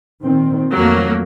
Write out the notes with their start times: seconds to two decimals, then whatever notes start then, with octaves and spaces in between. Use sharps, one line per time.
0.23 A#2 D#3 C4
0.75 F2 F#3 A3 A#3